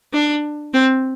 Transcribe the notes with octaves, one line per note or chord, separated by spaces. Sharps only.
D4
C4